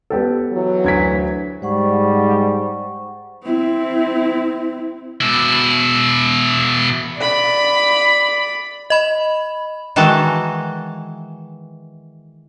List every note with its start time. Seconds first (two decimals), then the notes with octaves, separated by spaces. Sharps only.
0.10 B3 G4 A4
0.52 E3 F#3
0.84 D2 G#6 B6
1.62 G#2 G3 C5 F#5 C#6
3.44 C4 E4
5.21 B2 E4
7.17 D5 B5
8.90 D#5 B5
9.96 D#3 E3 G#3 F#4 E5 A5